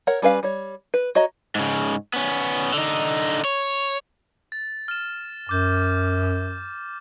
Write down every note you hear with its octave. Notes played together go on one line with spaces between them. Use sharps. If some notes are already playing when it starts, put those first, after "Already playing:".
A#4 C#5 F#5
G3 C#4 B4 F5
G3 C#5
B4
F#4 C#5 D#5 A#5
G#2 C#3
B3 C#4
D3 D#4
C#5
A6
F6 E7
F#2 D6 G6